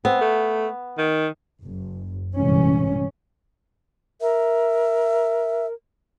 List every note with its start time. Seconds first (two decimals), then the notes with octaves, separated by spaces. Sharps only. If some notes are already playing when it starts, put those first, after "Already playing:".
0.05 B3 C4
0.21 A3
0.98 D#3
1.63 F#1
2.35 A#1 G2 C3 E3 G#3 C#4
4.21 A#4 E5